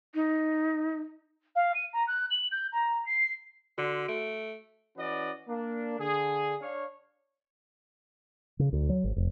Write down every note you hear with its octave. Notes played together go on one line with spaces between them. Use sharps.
D#4
F5
D#7
A#5
F#6
F#7
G6
A#5
C7
D3 F#4
A3 D7
E3 C#4 F#4 B4 D5 D#5
A#3 D4
D3 G#4
D4 C#5 F5
C#3
D2
F#3
G#1
F1